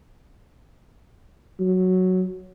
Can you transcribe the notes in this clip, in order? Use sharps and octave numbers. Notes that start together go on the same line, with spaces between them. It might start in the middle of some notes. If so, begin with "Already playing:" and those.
F#3